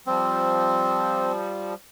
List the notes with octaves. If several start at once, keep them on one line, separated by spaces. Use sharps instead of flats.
F3 G3 C4